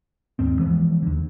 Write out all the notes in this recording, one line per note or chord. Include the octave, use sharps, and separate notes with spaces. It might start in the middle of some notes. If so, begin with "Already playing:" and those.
D#2 G#2 C4
E3 F3 G#3 B3
D#2 D3